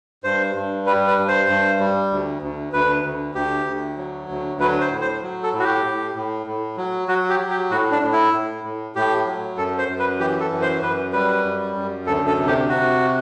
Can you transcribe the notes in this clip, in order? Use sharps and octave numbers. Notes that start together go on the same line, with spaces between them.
G2 C5
G2
G3 B4
B4
G2
C5
G2
G3
D2
D2
D2 B4
D2
D2 G4
D2
F#3
D2
F#3 B4
C5
A2
C5
F#3
A4
A2
F#4
G4
A2
A2
A2
F#3
F#3 F#4
G4
F#3
G4
A2 F#4
D4
A2
E4
A2
A2
A2 G4
F#3
F#2 A4
C5
F#2
B4
E3 G4
A4
F#2
C5
F#2 B4
G3 B4
F#2
F#2
D2 A4
A4
C3
G4
C3 F#4